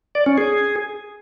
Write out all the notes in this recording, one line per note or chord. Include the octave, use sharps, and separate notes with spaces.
D5
C#4
G#4